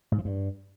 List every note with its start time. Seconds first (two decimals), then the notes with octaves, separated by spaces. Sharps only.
0.12 G#2
0.18 F3
0.25 G2